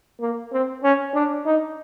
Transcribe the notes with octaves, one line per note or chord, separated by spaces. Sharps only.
A#3
C4
C#4
D4
D#4